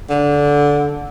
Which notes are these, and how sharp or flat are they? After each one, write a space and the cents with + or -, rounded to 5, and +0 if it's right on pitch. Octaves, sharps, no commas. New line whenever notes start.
D3 -15